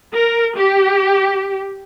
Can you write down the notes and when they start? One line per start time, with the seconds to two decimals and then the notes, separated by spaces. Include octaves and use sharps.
0.12 A#4
0.55 G4